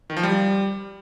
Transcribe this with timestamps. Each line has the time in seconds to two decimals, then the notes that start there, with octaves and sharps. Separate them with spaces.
0.10 D#3
0.17 F3
0.23 G3